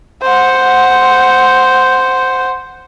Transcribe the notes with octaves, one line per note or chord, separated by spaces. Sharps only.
C5 F#5